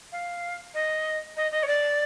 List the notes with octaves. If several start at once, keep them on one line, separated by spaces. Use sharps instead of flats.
F5
D#5
D#5
D#5
C#5
D5